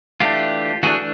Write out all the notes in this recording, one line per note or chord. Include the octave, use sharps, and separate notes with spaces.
E3 A3 D4 F4 G4
E3 A3 D4 F#4 G#4